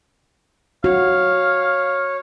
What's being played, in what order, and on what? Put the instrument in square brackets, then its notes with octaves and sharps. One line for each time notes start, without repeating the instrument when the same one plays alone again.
[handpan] F#4 [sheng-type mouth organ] C#5 [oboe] F5